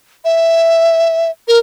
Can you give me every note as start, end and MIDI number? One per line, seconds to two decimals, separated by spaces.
0.25 1.31 76
1.48 1.58 70